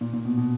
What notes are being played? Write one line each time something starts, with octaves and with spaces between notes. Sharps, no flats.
A#2
A#2
B2
B2